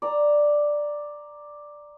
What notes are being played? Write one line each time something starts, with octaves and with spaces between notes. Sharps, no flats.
D5 A#5